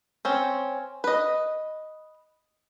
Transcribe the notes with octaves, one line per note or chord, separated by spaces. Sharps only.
C4 C#4
B4 D#5